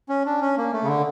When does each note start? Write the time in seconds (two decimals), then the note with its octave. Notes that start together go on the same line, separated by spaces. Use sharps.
0.09 C#4
0.26 D4
0.41 C#4
0.57 A#3
0.72 A3
0.83 C#3
0.88 D3